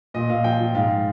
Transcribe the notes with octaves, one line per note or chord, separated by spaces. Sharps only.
A#2 D#5
A#2 F5
F3 G5
F3
G#2 F5